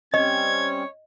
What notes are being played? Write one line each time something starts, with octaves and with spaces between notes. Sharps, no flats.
G3 C4 C#4 C#5 D#5 G#6